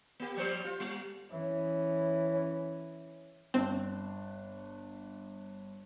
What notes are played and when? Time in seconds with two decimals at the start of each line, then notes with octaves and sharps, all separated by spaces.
0.20 A#3 G4
0.37 F3 G3 C5
0.64 F4
0.80 G3
1.31 E3 C#4
3.54 G1 C4 D4